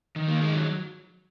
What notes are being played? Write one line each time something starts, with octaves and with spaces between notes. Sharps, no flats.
D#3
A#3
G#3
F#3